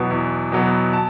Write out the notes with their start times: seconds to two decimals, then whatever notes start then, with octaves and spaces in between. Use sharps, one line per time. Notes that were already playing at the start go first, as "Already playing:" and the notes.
Already playing: E2 B2 F#3 B3
0.11 E2
0.52 B2 F#3 B3
0.93 A5